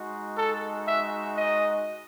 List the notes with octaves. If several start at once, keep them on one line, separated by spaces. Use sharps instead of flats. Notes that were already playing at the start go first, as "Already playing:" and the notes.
Already playing: G#3 D#4 F#4
A4
E5
D#5